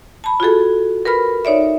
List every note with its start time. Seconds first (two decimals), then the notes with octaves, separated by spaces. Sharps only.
0.24 A5 B5
0.40 F4 F#4 G#4 A4
1.05 A#4 B4 B5 F6
1.45 D#4 C#5 D5 E5